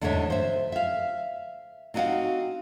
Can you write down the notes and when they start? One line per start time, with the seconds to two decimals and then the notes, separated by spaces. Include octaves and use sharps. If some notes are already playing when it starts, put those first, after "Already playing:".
0.01 E2 G#2 D3 A3 C#5 E5
0.30 C5 E5
0.72 E5 F5
1.94 C4 D#4 F#4 D5 F5 F#5